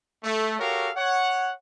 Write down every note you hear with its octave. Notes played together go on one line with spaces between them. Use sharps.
A3
F#4 G4 A4 A#4 C#5 F5
C#5 F#5